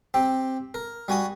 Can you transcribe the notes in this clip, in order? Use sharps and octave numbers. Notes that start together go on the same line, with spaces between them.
C4 G4
A#4
G3 F#4 G#5 D#6